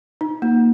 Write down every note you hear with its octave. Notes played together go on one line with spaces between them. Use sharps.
D#4
A#3